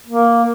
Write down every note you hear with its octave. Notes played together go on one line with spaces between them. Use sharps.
A#3